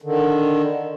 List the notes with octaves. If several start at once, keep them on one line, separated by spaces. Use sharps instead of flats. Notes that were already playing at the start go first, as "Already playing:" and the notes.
D3 D#3